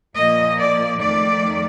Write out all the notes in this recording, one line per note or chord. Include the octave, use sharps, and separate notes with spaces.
A#2 F3 A#3 D#5
D5
F2 D#3 A3 D5